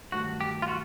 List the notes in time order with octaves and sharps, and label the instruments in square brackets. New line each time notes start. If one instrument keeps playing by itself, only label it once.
[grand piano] G2 D#3 F#3 A3 [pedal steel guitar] F#4
[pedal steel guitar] G4
F4
F#4